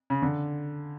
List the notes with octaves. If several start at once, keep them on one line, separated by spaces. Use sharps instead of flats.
C#3
D3